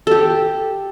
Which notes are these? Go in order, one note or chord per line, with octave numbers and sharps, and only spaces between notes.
G4 A4